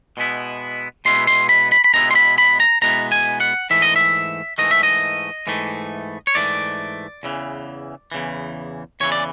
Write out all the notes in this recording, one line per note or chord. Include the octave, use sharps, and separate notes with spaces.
B2 G#3 B3 E4
B2 G#3 B3 E4 C6
C6
B5
B5
B5
B2 G#3 B3 E4 A#5
C6
B5
B5
A#5
B2 G#3 B3 E4 A#5
G#5
F#5
G#2 E3 A3 E5
D#5
E5
G#2 E3 A3 D#5
E5
D#5
G#2 E3 A3
C#5
G#2 E3 A3 D5
E2 C#3 E3
E2 C#3 E3
E2 C#3 E3 C#5
D5